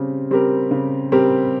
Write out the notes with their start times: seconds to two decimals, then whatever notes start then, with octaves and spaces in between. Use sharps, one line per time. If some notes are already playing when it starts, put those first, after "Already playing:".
Already playing: C#3 G3 C4 G4
0.31 G3 C4 G4 A#4
0.71 C#3
1.12 G3 C4 G4 A#4